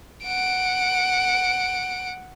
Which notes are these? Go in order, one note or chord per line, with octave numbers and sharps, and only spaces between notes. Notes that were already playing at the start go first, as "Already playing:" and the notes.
F#5 D7